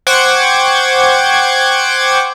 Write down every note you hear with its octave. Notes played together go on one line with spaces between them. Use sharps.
C5 F#5 G5 C#6 D6 G#6